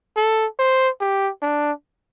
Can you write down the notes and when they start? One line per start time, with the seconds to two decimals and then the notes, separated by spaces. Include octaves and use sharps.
0.17 A4
0.59 C5
1.01 G4
1.42 D4